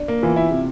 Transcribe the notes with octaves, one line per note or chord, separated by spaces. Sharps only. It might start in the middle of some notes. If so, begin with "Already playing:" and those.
Already playing: D4
A#3
E3 F4
E4
C3